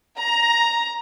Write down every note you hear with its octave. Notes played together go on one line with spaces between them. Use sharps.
A#5